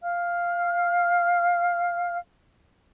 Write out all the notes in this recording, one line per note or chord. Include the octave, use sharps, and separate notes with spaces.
F5 F6